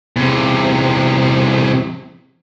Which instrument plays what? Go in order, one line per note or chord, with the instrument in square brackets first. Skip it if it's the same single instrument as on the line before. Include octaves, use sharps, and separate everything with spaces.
[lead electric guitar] E2 C3